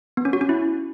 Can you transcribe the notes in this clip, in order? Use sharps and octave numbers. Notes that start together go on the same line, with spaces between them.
B3
C#4
F#4
C#4
E4